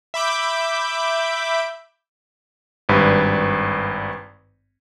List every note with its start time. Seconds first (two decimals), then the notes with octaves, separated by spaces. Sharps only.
0.14 E5 B5 D6 G6
2.89 G#1 G2 B4